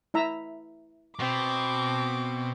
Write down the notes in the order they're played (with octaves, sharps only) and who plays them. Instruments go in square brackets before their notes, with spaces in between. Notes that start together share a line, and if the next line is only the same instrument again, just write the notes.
[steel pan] E4 E5 A#5
[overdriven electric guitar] B2 [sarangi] C4 [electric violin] D6